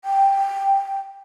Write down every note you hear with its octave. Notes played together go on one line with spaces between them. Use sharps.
G5